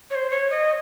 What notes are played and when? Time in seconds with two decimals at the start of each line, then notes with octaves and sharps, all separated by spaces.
0.10 C#5
0.15 C5
0.30 C#5
0.50 D#5